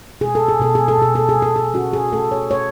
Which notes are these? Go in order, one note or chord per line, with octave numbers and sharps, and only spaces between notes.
B2 G#4
A4
G#4
B2 A4
G#4
A4
B2 G#4
A4
G#4
B2
A4
G#4
C#4 F#4
G#4
A3 A4
C#5
A3 C#5